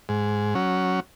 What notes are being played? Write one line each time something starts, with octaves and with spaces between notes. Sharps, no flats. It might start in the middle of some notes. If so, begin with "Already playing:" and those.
G#2
F#3 C#4